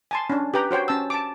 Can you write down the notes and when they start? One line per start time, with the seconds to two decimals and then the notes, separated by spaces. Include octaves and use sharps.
0.11 G#5 A5 C6
0.30 C#4 D4
0.54 G4 B4 G5 A#5
0.71 F#4 C5 C#5 G5
0.88 C#4 A5 E6
1.10 A5 D6